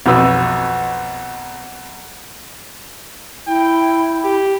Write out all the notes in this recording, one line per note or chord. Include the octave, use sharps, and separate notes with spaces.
B1 F2 F#4 B4 C5 E6
E4 G5
G4